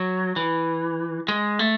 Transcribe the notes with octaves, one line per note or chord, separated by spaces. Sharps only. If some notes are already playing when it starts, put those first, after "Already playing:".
Already playing: F#3
E3
G#3
A3